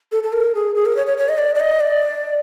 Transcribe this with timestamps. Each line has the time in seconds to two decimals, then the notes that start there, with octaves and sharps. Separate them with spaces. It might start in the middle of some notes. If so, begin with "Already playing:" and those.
0.12 A4
0.23 A4
0.33 A#4
0.55 G#4
0.75 G#4
0.86 A#4
0.96 C#5
1.07 C#5
1.18 C#5
1.29 D#5
1.38 D5
1.55 D5
1.60 D#5
1.81 D5